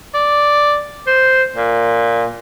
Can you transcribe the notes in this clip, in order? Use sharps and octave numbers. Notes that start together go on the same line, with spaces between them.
D5
C5
A#2